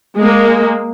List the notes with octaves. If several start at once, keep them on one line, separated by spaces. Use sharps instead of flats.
G#3 A#3